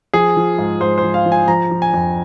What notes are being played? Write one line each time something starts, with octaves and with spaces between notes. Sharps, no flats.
F3 G#4
F3
G#2
G#2 C5
C5
F3
F5
F3
G#5
F3 A#5
F3
G#5
F2